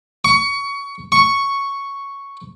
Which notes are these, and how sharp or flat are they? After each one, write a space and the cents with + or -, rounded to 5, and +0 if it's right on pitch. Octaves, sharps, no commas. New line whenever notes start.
C#6 +20
C#6 +0